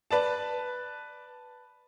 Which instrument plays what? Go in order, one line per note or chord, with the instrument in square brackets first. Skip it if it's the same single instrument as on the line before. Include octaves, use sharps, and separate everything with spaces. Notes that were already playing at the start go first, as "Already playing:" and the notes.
[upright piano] B4 D5 A5